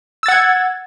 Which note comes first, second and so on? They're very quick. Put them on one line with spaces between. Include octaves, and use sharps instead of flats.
E6 A6 F#5 G#6